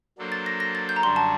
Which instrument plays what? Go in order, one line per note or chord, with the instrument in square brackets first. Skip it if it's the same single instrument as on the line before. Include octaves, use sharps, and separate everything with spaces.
[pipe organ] F#3 A#3 D4 A4 C5
[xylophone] A6
A#6
A#6
A6
G6
A#5
[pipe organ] F#2 D3 G3 D4 F#4 [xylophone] C6
[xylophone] A5